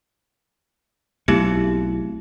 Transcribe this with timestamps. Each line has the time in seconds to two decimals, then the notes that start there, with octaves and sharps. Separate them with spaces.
1.28 B1 A3 C4 E4 G4